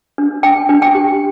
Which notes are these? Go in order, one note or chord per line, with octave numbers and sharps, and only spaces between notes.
D4
D4 G5
D4
G5
G4